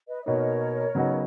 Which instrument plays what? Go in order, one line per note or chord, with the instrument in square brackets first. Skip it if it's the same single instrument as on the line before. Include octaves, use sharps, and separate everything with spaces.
[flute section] B4 D#5
D#5
[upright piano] B2 A#3 D#4 [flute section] A#4 C#5
[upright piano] C#3 F#3 B3 D#4 F#4